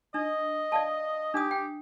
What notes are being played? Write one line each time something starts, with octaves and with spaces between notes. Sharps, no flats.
D4 D#5
D5 F5 A5
D4 G4 D#6
G5